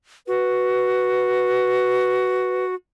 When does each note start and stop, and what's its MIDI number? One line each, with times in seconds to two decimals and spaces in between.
0.27 2.75 66
0.27 2.65 71